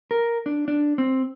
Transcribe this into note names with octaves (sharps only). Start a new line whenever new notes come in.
A#4
D4
D4
C4